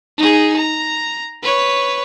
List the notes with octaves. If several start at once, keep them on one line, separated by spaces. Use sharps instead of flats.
D#4 G#4
A#5
B4 C#5